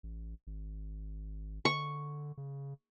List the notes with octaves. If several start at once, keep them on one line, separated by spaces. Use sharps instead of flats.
A1
G#1
D3 C#6
C#3